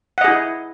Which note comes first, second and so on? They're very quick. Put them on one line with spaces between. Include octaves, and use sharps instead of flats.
F#5 D#5 G#4 E4